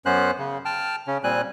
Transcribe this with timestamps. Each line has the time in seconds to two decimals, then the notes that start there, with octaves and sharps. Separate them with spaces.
0.06 F#2 B3 C#4 C5 F#6
0.39 C#3
0.65 G5 A5 F6
1.07 C#3 C#4
1.24 A#2 G3 C4 G#5 F#6